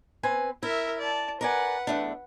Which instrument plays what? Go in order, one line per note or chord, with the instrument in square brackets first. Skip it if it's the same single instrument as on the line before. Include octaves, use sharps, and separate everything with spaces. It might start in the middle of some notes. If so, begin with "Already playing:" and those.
[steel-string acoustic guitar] C4 B4 G#5
[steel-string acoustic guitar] E4 [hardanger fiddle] A#4 E5
[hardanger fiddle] D5 A5
[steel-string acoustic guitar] A#4 D5 G#5 [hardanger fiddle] B4 F#5
[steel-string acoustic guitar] E2 A3 D4